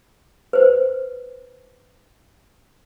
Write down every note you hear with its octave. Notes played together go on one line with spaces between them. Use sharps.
B4 C5